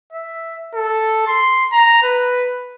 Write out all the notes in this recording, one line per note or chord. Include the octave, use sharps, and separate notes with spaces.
E5
A4
C6
A#5
B4